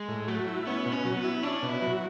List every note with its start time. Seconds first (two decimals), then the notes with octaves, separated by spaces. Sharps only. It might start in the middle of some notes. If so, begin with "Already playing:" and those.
Already playing: G#3
0.08 A2
0.27 F#3 A3
0.47 E4
0.67 B3 C#4
0.86 B2
0.92 C#4
1.05 F#3
1.17 B3
1.24 E4
1.43 C#4 D4
1.63 B2
1.69 E4
1.82 F#3